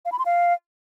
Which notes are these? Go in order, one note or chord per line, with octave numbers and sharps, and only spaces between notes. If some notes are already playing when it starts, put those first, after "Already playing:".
F5
B5
C6
F5